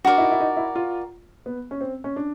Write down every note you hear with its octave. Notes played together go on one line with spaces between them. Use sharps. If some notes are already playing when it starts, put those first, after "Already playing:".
D4 F#4 A#4 D5
E4
D#4
E4
D#4
E4
F4
B3
C#4
C4
C#4
D4